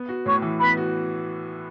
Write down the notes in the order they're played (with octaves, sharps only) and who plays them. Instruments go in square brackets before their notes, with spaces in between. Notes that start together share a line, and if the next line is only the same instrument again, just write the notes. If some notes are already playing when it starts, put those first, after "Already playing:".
Already playing: [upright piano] B3
F#4
[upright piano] A2 [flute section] C#5 C#6
[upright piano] E3
[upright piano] B3 [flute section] B4 B5
[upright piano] F#4